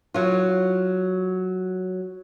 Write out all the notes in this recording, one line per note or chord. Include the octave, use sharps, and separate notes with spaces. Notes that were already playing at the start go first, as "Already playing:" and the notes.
F#3 F4